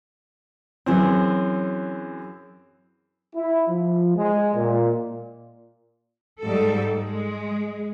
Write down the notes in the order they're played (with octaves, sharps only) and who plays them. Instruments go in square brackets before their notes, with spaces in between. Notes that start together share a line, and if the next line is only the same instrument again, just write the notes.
[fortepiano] F#2 E3 C4 [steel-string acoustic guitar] F#3 G#4 C#5
[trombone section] E4
F3
G#3
A#2
[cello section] G#2 G3 A4
G#3